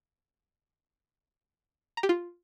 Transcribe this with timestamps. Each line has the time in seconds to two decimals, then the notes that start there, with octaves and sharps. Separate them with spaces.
1.97 A#5
2.03 G4
2.09 F4